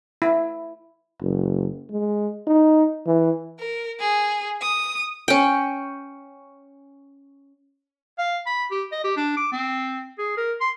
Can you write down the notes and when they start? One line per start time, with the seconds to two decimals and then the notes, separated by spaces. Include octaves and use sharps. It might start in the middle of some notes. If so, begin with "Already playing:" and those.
0.22 E4
1.21 F#1
1.90 G#3
2.47 D#4
3.06 E3
3.59 A#4
4.00 G#4
4.61 D#6
5.28 C#4 G5
8.19 F5
8.47 B5
8.71 G4
8.92 D#5
9.04 G4
9.17 D4
9.37 D6
9.52 C4
10.19 G#4
10.37 A#4
10.61 C6